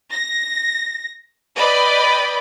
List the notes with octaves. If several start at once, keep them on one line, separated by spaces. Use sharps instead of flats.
A#6
B4 D5 D#5 G5 B5